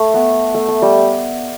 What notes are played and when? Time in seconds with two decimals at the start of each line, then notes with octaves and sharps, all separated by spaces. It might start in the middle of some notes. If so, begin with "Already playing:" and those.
Already playing: A3
0.14 B3
0.54 A3
0.68 A3
0.82 G3